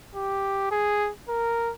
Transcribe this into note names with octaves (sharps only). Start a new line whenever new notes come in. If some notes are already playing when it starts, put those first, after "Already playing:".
G4
G#4
A#4